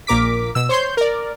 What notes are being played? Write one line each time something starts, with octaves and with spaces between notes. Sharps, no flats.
A#1 A#2 A#4 D6 B6
B2 E6
C5 C#5 C6 G6
A#4 D5